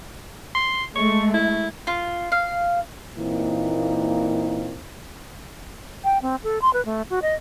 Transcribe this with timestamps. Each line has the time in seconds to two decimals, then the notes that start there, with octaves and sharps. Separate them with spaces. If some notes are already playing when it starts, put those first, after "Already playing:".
0.55 C6
0.96 G#3 A3 C#6
1.34 E4
1.87 F4
2.32 F5
3.18 A#2 E3 A#3 C4 D#4
6.04 G5
6.22 C4
6.44 A4
6.62 C6
6.73 B4
6.86 A3
7.10 F#4
7.22 D#5